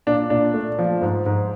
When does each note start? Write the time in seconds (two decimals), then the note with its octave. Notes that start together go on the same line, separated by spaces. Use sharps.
0.07 A#2 D4
0.30 A#2 D4
0.54 A3
0.79 F3
1.02 G#2
1.26 G#2